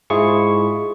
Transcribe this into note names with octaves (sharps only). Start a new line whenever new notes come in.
G#2 G#3 E4 F4 G#4 C#6